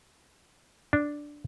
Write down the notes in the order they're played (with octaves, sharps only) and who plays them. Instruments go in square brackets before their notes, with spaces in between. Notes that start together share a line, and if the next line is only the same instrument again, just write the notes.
[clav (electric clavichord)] D4